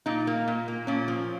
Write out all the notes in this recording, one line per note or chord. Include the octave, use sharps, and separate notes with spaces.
A#2 D#4
A#3
A#2
A#3
A#2 C#4
F3